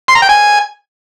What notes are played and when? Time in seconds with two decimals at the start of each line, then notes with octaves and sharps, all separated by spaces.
0.08 C6
0.15 A#5
0.22 G5
0.29 G#5